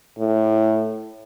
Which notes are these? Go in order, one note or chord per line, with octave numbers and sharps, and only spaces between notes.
A2